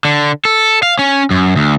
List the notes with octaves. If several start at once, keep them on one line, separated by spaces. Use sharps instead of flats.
D3
A4
F5
C#4
F#2
D2